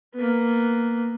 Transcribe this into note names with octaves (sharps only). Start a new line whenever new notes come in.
A#3 B3